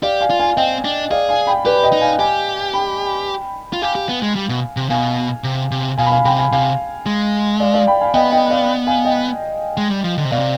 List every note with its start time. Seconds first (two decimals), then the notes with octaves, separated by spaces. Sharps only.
0.02 G4 D5 F5
0.21 F5 G#5
0.30 F4
0.39 F5 G#5
0.57 C4 D#5 G5
0.85 D4
1.11 G#4 D5 F5
1.29 F5 G#5
1.47 G5 B5
1.65 G4 B4 D5
1.83 D#5 G5
1.93 D#4
2.01 F5 G#5
2.19 G4 F5 G#5
2.73 G5 B5
3.73 F4
3.82 G4 F5 G#5
3.95 G4
4.09 B3
4.22 G#3
4.36 G3
4.49 B2
4.77 C3
4.90 B2 F5 G#5
5.44 C3
5.71 C3
5.98 B2 F5 G#5
6.06 B5
6.11 F5 G#5
6.25 C3 G5 B5
6.38 F5 G#5
6.52 C3 F5 G#5
7.06 G#3
7.60 D5 F5
7.74 D5 F5
7.87 G5 B5
8.01 F5 G#5
8.14 B3 D#5 G5
8.32 D#5 G5
8.50 D5 F5
8.87 F5 G#5
9.05 D#5 G5
9.77 G#3
9.90 G3
10.04 F3
10.17 D3
10.25 C3
10.31 B2 D5 F5
10.39 C3